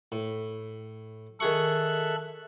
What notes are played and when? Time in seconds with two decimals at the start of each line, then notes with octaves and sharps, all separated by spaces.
0.12 A2
1.40 D#3 G#4 A4 E5 C#6 F#6